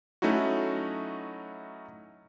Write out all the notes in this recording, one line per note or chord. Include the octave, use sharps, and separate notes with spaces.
F#3 A3 C#4 D#4 E4 F#4